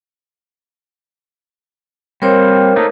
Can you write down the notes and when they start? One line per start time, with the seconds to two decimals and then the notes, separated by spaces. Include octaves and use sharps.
2.22 G3 A#3 C4 A#4 C5 C#5
2.76 A3 A#3 D#4